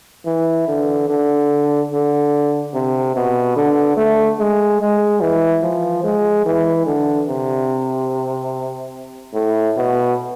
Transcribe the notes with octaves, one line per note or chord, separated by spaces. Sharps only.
E3
D3
D3
D3
C3
B2
D3
A3
G#3
G#3
E3
F3
G#3
E3
D3
C3
A2
B2